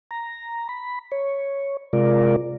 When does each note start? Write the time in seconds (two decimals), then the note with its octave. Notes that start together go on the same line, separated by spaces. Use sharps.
0.11 A#5
0.69 B5
1.12 C#5
1.93 C3 G#3 F4 A#4 D5